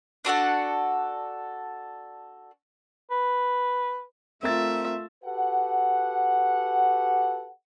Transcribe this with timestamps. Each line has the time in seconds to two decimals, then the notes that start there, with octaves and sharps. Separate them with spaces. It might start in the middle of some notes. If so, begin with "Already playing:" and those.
0.25 D4 F#4 A4 F#5
3.11 B4
4.43 A3 C4 F4 A#4 E5 A6
5.24 F#4 G4 A4 B4 F#5